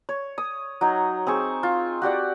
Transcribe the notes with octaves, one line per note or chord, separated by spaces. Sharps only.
C#5
D#6
F#3 D#4
C4 G#4 C#6
F4
F#4 G4 D5 F#5